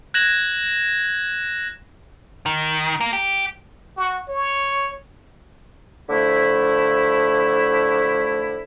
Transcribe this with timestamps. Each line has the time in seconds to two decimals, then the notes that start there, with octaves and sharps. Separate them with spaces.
0.14 F#6 G#6 A#6 E7 F#7
2.46 D#3
3.01 A#3
3.13 G4
3.97 F#4
4.28 C#5
6.09 D3 F3 A3 E4